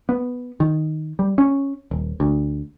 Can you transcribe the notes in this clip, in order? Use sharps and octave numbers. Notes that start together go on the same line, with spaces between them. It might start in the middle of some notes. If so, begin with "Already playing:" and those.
B3
D#3
G3
C#4
D#1
D2